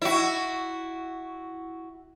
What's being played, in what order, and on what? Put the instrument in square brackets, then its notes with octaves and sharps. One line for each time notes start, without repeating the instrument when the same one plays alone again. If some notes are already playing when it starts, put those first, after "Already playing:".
[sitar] E4 F#4